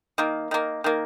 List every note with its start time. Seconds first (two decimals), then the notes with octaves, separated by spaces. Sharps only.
0.18 D#3 A#3
0.51 D#3 A#3
0.84 D#3 A#3